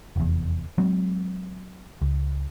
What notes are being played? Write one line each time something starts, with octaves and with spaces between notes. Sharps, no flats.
F1 E2
F#3 G#3 C4
C#2